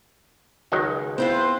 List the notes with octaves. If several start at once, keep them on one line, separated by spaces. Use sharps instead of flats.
C#2 D#3 F#3 D#4
B3 C4 E4 F4 B4 C5